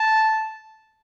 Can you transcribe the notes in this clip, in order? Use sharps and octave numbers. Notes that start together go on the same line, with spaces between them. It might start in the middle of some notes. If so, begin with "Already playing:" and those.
Already playing: A5